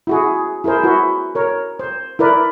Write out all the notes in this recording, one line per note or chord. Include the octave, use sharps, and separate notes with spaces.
E4 F#4 G#4
E4 G#4 A#4 C5
E4 F#4 B4
A#4 C#5
C5
E4 A#4 B4 D5